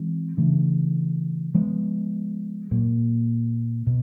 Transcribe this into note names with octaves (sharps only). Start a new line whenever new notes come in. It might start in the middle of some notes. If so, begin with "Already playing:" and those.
Already playing: E3 G#3 C4
C#3 E3 A3 D4
F3 G#3 B3
A#2 F#3 A#3
B2